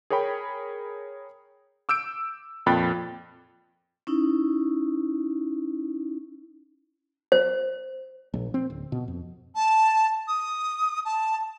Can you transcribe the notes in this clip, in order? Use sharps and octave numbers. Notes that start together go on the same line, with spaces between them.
G#4 A#4 C#5 G5 B5
D6 E6 G6 D7
F2 A#2 G5 B5 F#6 A6
C#4 D#4 E4
C5
A#1
C4
D1
B2
F2
A5
D#6
A5